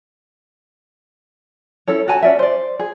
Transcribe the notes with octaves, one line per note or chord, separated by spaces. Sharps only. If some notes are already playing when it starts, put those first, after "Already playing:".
C#4 E4 A4 C#5
F#4 C#5 G#5 A5
C#4 D5 E5
C5 D5
G#4